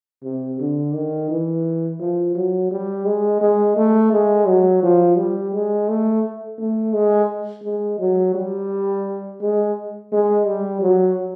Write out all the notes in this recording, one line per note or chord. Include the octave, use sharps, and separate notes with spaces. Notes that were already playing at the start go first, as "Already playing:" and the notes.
C3
D3
D#3
E3
F3
F#3
G3
G#3
G#3
A3
G#3
F#3
F3
G3
G#3
A3
A3
G#3
G#3
F#3
G3
G#3
G#3
G3
F#3